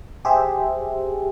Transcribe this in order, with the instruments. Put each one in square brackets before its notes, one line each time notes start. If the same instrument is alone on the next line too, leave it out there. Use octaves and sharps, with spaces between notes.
[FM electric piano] G4 G#4 C5 E5